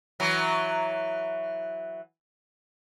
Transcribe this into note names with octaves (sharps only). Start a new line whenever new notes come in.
E3 F#3